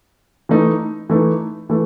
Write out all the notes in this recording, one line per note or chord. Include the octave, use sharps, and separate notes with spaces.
E3 A3 D#4
E3 A3 D#4
E3 A3